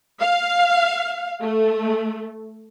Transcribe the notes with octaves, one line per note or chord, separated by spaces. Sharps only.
F5
A3